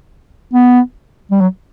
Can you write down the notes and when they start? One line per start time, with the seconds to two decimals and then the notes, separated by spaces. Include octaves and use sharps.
0.54 B3
1.32 G3
1.41 F#3